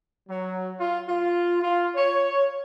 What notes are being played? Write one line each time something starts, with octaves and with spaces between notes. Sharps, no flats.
F#3
F4
F4
F4
C#5